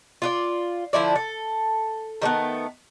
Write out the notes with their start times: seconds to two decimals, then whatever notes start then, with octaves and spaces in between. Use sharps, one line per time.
0.22 F4 F#4 D5
0.93 D3 F3 E4 D5
1.16 A4
2.22 D#3 G3 A3 B3